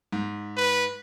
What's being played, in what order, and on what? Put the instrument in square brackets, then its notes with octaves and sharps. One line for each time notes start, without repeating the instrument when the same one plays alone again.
[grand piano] G#2
[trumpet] B4